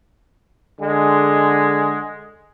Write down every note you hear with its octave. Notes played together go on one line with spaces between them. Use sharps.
D3 G#3